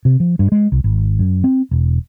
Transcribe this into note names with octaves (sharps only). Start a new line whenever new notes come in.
C3
F3
G2
G#3
C2
G#1
F#2
C4
E1